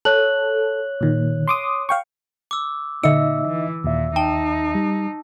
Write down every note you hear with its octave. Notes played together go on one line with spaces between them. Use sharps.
A4 C#5 F#6 F#7
A#2 D#3
C6 D6 D#6
F5 G5 C#6
D6 E6
A#2 D3 D#4 D#5 E5 E6 C#7
E3
D#2 A#2 E5
D#4 G5 A5
G3